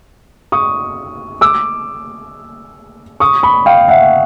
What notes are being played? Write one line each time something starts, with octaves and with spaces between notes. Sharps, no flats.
C#6 D#6
D6 E6
C#6 D#6
B5 C#6
F5 G5
E5 F#5